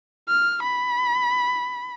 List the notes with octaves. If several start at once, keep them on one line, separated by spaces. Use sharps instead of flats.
F6
B5